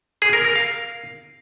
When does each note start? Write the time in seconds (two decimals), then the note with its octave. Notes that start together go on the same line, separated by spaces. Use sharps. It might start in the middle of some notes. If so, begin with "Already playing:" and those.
0.22 G#4
0.33 A#4
0.44 A#4
0.56 F5